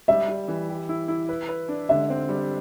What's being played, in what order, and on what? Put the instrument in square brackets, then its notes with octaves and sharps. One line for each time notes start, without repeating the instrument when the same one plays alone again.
[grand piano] G3 [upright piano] E5
[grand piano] G3
E3
G4
E4
E4
B4
B4
D4
[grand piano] D3 [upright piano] E5
[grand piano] C4
G3